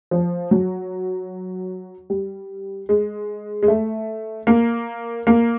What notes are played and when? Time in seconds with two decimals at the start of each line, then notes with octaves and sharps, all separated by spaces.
0.11 F3
0.51 F#3
2.10 G3
2.89 G#3
3.63 G#3
3.68 A3
4.47 A#3
5.27 A#3